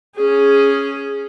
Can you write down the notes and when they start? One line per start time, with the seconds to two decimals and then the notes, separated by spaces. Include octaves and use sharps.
0.16 C#4 G#4